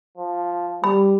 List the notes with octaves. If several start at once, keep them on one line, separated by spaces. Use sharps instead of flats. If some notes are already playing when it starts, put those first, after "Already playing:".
F3
G3 B5